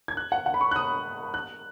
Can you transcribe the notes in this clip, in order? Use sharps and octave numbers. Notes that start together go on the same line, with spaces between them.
G#6
F#6
F#5
F#5
B5
C#6
F#6
D#6
F#6